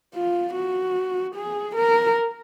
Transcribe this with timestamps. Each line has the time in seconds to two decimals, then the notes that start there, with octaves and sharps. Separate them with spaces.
0.14 F4
0.54 F#4
1.36 G#4
1.76 A#4